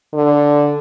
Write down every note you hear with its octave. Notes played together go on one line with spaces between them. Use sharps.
D3